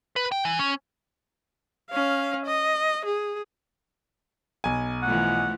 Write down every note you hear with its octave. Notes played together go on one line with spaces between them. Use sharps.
B4
G5
E3
C#4
C#4 F5
D#5
G#4
B1 G#5
E3 F3 A3 F#5